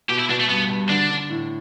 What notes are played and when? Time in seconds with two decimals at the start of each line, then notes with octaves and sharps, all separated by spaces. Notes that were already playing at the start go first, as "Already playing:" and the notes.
0.09 B2 G4
0.19 E4
0.29 B2 D4
0.40 A3
0.49 G2 B3
0.69 G2
0.90 D3 D4
1.10 D3
1.30 A2